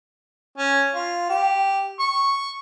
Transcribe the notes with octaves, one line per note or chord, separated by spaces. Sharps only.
C#4
F4
G4
C#6